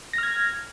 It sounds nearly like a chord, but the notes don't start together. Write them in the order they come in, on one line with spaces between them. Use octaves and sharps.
A#6 F6 G#6